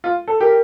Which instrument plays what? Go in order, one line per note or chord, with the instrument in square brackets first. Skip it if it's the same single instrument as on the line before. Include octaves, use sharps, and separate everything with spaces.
[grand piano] F4
A4
[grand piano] G4 [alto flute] A#4